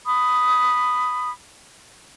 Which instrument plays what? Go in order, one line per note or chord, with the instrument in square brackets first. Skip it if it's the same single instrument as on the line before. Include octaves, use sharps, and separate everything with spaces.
[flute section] B5 D#6